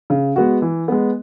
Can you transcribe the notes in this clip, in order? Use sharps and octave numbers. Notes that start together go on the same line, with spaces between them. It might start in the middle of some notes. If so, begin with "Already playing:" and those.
C#3
G#3 B3 F#4
E3
G#3 B3